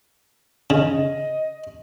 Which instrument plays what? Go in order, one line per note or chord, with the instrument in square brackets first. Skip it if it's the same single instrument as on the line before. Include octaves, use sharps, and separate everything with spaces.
[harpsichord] C#3 [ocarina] D#5